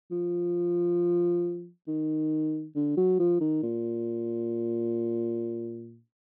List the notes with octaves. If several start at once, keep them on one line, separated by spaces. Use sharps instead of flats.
F3
D#3
D3
F#3
F3
D#3
A#2